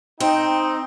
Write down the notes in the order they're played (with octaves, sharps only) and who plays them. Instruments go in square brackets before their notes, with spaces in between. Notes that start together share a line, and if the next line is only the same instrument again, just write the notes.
[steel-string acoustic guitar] C4 [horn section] D#4 [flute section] G5